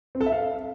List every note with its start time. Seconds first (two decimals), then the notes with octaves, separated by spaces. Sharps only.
0.15 C4
0.21 A4
0.26 E5
0.32 F5